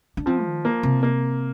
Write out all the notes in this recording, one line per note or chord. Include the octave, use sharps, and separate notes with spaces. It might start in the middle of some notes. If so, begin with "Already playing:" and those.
D4
F3 C4
D#3
A#3
C3
A#3